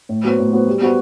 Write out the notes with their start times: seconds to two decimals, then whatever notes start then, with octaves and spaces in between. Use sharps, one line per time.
0.09 A2
0.24 F#3 B3 F#4 C5
0.39 A2
0.52 F#3 B3 F#4 C5
0.67 G3
0.81 B3 F#4 C5